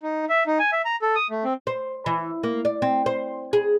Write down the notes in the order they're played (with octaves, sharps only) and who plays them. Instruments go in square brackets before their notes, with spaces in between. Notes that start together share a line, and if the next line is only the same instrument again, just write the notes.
[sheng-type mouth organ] D#4
E5
D#4
G#5
E5
A#5
A4
D#6
A3
C4
[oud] C5
E3
A#3
D5
C4
C5
G#4